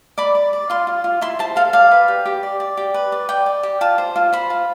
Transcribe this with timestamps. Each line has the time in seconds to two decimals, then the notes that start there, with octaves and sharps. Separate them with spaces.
0.18 D5 B5
0.35 D5
0.53 D5
0.70 F4 C6
0.87 F4
1.04 F4
1.21 E4 C6
1.39 C5 A5
1.56 A4 F5
1.73 D5 F5
1.91 B4
2.08 G4
2.25 G4
2.43 D5
2.60 D5
2.77 G4
2.94 B4
3.12 D5
3.29 D5 G5
3.46 D5
3.63 G4
3.81 F4 A5
3.98 C5
4.16 F4
4.33 C5 B5
4.50 F4